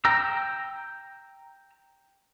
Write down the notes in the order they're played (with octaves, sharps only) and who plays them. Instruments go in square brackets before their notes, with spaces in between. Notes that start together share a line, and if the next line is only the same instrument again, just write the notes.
[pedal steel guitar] G5 A#5 E6